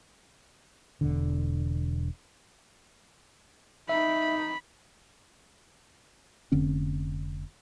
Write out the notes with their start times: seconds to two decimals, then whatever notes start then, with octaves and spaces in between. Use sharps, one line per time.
1.01 E1 D3
3.89 D#4 E5 B5
6.52 F1 D3 C4 C#4